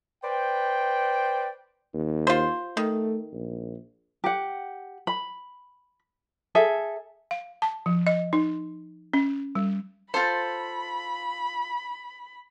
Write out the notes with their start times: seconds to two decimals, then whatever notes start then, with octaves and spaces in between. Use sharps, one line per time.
0.24 B4 C5 D5 G5
1.94 D#2
2.27 F4 C5
2.77 D#3 A3
3.33 A#1
4.24 G4 F#5
5.07 B5
6.55 G#4 A4 E5
7.31 F5
7.62 A5
7.86 F3
8.07 D#5
8.33 D#4
9.14 C#4
9.55 G3
10.14 F4 A4 C5 B5